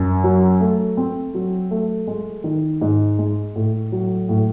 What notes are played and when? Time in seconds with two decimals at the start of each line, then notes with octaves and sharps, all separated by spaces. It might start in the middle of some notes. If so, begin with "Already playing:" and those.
Already playing: F#2
0.24 F#3
0.61 A3
0.97 C4
1.34 F#3
1.71 A3
2.07 G#3
2.44 D#3
2.81 G#2
3.19 G#3
3.56 A2
3.92 F#3
4.29 A2